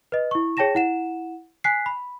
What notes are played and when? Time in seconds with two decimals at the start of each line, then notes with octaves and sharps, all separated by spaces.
0.12 B4 D#5
0.31 E4 C#6
0.57 G#4 C#5 G5 A5 A#6 E7
0.75 E4 F#5 E7
1.64 G#5 F#6 B6 C7
1.86 B5